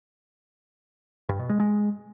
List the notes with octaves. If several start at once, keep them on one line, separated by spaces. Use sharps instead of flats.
G2
B2
G#3
G#3